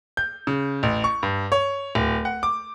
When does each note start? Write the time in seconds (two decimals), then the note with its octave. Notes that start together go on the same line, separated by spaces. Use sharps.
0.17 G6
0.47 C#3
0.83 A1
1.04 C#6
1.23 G2
1.52 C#5
1.95 D1
2.25 F#5
2.43 D6